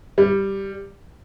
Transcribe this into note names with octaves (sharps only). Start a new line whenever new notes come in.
G3